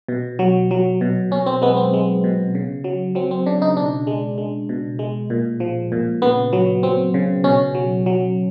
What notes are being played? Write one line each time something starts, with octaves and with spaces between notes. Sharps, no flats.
B2
F#3
F#3
B2
B2 C#4
C4
G#3 B3
C4
G#3
B2
C#3
F#3
F#3 C4
C4
C#3 D4
D#4
B2 D4
G#3
G#3
B2
G#3
A#2
F3
A#2
C#3 B3
F#3
F#3 C4
C#3
B2 C#4
F#3
F#3